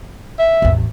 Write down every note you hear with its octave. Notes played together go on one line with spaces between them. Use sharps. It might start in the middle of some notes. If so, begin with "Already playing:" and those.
E5
A1 E2